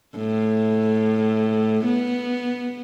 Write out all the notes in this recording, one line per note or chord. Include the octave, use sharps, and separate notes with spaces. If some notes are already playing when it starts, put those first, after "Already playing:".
A2
B3